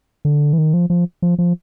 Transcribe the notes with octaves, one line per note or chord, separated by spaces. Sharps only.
D3
E3
D#3
F3
F3
F3
F3